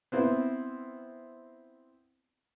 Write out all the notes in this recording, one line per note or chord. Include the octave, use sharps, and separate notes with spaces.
B3 C4 E4